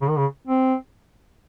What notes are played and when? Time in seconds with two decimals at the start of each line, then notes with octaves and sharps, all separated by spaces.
0.01 C#3
0.09 D#3
0.17 C#3
0.47 C4